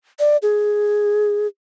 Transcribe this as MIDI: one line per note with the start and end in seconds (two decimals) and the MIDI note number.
0.19 0.37 74
0.42 1.47 68